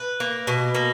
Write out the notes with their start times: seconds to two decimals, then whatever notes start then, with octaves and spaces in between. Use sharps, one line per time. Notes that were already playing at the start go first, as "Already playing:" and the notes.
Already playing: B4
0.20 A#3
0.47 B2
0.75 A#3